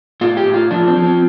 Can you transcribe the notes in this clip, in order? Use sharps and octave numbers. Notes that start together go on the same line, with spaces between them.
A2 F4
G4
A2
F4
F3 D4
C4
F3
C4